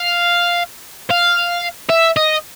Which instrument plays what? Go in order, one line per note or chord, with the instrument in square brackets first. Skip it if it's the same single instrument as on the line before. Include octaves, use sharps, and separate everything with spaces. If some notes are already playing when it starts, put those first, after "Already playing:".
Already playing: [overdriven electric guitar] F5
F5
E5
D#5